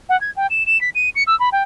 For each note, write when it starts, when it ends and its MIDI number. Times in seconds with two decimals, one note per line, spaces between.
0.09 0.19 78
0.21 0.31 92
0.36 0.47 79
0.50 0.66 100
0.66 0.80 100
0.81 0.90 95
0.95 1.09 99
1.15 1.23 97
1.27 1.38 88
1.40 1.49 83
1.52 1.63 79